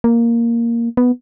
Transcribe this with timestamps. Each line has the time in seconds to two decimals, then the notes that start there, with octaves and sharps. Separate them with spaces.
0.04 A#3
0.97 B3